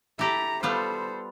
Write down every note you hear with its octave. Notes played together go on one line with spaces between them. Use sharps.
E4 G4 A4 A#5
G3 B3 F4 A4 C5